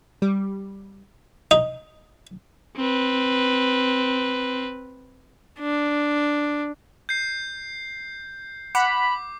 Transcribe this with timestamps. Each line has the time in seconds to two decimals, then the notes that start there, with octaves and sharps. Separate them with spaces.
0.22 G3
1.51 D#4
2.77 C4 B4
5.60 D4
7.09 G6 C7
8.75 F#5 B5 D6